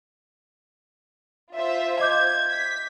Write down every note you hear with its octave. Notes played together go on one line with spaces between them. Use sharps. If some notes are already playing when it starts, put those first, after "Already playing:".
F4 C5 E5
D#5 D6 G6 G#6
B6